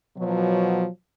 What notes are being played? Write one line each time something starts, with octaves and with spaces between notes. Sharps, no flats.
B2 F3 F#3